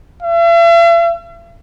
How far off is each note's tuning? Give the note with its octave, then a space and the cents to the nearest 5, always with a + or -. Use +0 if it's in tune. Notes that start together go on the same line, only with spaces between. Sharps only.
E5 +45